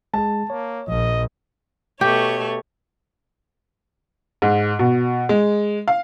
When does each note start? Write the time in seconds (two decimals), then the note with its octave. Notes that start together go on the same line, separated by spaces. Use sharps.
0.14 G#3 G#4 A5
0.50 A#3 C#5
0.88 A#1 F3 D#5
2.01 B2 A3 G4 C#5
4.42 G#2
4.79 B2
5.29 G#3
5.88 F5